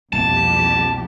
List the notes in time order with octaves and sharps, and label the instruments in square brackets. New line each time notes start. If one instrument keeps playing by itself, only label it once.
[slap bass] C2 B2 A#3 [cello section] F2 G4 [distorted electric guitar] A5